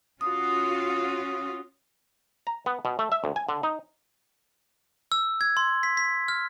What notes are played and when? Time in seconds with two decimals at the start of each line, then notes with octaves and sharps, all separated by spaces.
0.21 C#4 F4 F#4 D#6
2.47 A#5
2.66 B3
2.85 B2
2.99 A3
3.12 E5
3.24 D2
3.36 G#5
3.49 D3
3.63 D#4
5.12 E6
5.41 G#6
5.57 C6
5.83 B6
5.97 B6
6.28 F6